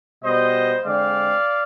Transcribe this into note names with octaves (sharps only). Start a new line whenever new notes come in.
B2 G3 B3 C5 D#5
D3 G#3 C4 D5 F5